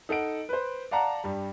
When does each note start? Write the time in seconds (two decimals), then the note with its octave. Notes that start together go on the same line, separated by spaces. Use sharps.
0.09 D#4 A4 F#5 D7
0.49 B4 C5
0.91 D5 F5 F#5 A5 A#5
1.24 G2 G3